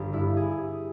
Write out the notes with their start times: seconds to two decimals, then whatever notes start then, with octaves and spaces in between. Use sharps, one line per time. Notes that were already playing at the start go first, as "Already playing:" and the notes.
Already playing: G1 G4
0.13 G2 E4
0.37 G#4